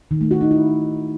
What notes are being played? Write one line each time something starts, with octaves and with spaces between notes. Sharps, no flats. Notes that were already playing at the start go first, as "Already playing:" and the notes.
D#3
A3
F#4
D#4
E4